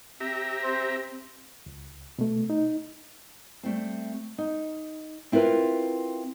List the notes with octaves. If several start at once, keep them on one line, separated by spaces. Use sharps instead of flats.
C4 G4 E5 A#5
C5
C#2
B2 A3
D#4
G3 A3 C4
D#4
C4 E4 F4 A#4 B4